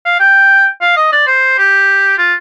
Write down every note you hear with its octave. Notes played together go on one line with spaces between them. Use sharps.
F5
G5
F5
D#5
D5
C5
G4
F4